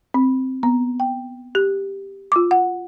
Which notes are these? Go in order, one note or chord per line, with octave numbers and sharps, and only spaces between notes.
C4
B3
G5
G4
F4 D6
F#5